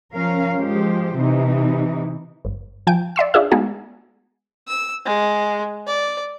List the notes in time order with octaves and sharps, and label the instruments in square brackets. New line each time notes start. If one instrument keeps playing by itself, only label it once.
[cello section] F3 C#4 A#4 F5
F3 G#3 G4 C5
C3 E3 D#4
[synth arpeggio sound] G1
F3 G5 G#5 D7
D5 E5 C6 E6
D4 F4 G#4 E5
G#3 A3 B3 D#4 F#4 G#4
[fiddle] E6
G#3
D5